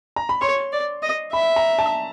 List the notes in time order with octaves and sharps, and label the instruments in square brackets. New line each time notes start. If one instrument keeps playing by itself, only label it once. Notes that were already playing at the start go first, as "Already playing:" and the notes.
[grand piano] A#5
B5
[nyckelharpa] C#5 [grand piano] C6
[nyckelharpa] D5
D#5
[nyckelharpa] E5 [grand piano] B5
[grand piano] A#5
A5